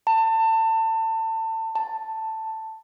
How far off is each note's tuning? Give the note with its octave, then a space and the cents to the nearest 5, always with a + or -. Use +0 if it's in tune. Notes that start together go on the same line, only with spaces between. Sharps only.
A5 +25
A5 +10